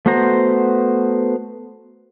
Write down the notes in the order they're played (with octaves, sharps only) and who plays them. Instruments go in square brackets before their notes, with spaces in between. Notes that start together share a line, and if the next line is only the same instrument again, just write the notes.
[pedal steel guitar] A3 B3 F#4 C5 A#5